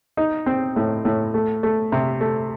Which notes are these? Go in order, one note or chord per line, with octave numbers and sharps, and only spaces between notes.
D#4
C4
A2
A2
A3
A3
C3
A3